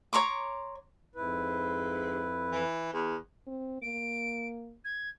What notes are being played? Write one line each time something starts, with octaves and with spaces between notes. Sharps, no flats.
C#5 A#5 C6 D6
F2 G#2 E4 B4
E3
E2
C4
A#3 D7
G#6